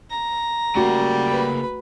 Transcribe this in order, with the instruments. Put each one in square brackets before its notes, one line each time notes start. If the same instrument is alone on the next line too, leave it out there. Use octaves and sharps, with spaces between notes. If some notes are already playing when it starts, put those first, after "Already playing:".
[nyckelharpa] A#5
[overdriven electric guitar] C#3 A#3 [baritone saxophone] G3 [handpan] A3 F#4
[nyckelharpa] B4 B5